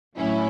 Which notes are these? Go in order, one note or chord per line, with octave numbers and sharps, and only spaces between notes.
A2 F#3 C#4 E4